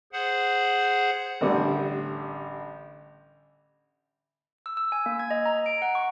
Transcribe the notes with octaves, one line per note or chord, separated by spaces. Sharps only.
G#4 C5 F#5
A1 D3 G3
E6
E6
G#5
A#3
G#6
D#5
A#5
D7
F#5
C#6